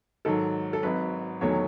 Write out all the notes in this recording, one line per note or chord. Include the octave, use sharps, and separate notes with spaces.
G#2 D#3 F#3 A4
A4
G#1 G#2 F#3 B4
E1 E2 D#3 F#3 A3 C#5